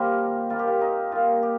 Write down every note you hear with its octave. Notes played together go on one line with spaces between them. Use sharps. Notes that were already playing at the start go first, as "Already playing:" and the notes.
Already playing: D#3 G3 A#3 C4 F4 G4 A#4 C5
A#2 G3 A#3 F4
G4
F4
D#4
A#2 G3 A#3 F4
G4